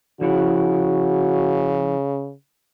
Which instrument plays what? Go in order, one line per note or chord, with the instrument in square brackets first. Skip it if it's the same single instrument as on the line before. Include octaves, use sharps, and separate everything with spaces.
[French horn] C#3 [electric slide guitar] F3 E4 F#5 [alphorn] F#4